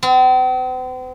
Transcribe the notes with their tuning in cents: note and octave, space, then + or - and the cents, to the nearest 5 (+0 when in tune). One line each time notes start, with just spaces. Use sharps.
C4 -45